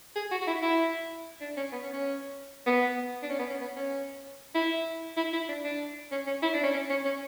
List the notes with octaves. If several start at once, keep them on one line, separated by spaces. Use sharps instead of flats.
G#4
F#4
F#4
E4
E4
D4
C#4
B3
C#4
C#4
B3
D4
C#4
B3
C#4
B3
C#4
E4
E4
E4
D4
D4
C#4
C#4
E4
D4
C#4
C#4
C#4
C#4